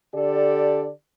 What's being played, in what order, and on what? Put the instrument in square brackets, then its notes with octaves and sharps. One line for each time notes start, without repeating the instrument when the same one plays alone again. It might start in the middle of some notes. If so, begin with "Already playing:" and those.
[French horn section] D3 G4 A4 D5